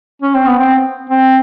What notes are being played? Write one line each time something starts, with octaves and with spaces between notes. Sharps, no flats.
C#4
C4
B3
C4
C4